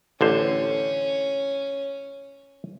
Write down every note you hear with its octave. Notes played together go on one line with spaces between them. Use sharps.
A1 D3 C#4 C5